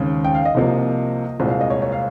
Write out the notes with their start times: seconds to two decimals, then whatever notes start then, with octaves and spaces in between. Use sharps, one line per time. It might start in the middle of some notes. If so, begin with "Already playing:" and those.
Already playing: D#2 C#3 G#3 C4
0.25 G5
0.35 F5
0.45 D#5
0.55 C2 C3 F3 A#3
1.40 C2 A#2 G#3 C4
1.50 F5
1.61 D#5
1.70 C#5
1.82 C#5
1.92 F5